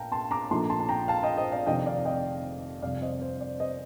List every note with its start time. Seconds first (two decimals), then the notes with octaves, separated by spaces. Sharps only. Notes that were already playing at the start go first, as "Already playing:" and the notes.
Already playing: A#1 A#2 A#3 F5 G5 A5 A#5
0.12 A5 C6
0.31 A#5 D6
0.50 A#1 A#2 F3 A3 D#4 A5 C6
0.70 A5 C6
0.80 A5
0.89 G5 A#5
1.08 F5 A5
1.23 D#5 G5
1.37 C5 D#5
1.52 D5 F5
1.67 F1 F2 C3 D#3 D#5 G5
1.86 D5 F5
2.05 D#5 G5
2.82 F2 C3 G3 D5 F5
3.02 C5 D#5
3.22 C5
3.41 D5
3.60 C5 D#5